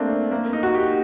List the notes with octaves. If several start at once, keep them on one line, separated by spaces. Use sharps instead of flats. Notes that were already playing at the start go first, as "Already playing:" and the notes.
Already playing: A3 A#3 C4 D4
A#3
D#4
F#4
G4